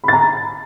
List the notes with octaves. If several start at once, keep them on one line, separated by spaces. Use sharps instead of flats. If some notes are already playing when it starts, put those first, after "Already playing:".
A#5 B5 A6